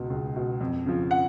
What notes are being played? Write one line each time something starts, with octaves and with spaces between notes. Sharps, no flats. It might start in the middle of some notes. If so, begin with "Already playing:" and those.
Already playing: C#2 B2
C#2
B2
F2
C#3 F3
F#5